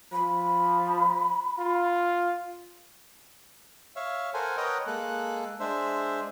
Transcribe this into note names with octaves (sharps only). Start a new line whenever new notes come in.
F3 B5
F4
C#5 E5 F5
A4 A#4 C5 F#5 G#5
A#4 B4 C#5 D#5 F#5 G5
G#3 A#3 A4 F#6
G#3 D4 C5 E5